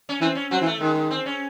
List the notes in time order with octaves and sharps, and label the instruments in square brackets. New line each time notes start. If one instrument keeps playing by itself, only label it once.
[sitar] C#4
[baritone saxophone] E3 [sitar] C4
[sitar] C#4
[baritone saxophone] F#3 [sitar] C4
[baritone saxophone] E3
[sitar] A3
[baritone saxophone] D#3 [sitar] G#3
[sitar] G#3
C4
C#4